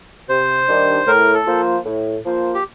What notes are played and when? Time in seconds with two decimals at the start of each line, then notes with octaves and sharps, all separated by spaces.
0.29 C3 C5
0.68 D#3 G3 D4
1.07 A2 A#4
1.34 A4
1.47 F3 A#3 F4 C5
1.85 A2
2.25 F3 A#3 F4 C5
2.54 G4